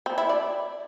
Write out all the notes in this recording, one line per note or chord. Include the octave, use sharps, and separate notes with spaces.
C4
E4
D5